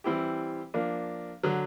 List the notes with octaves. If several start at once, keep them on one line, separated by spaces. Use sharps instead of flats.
E3 G3 C4 E4 G4
F3 A#3 D4
D3 F#3